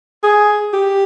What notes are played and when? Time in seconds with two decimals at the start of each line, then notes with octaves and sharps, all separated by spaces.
0.23 G#4
0.73 G4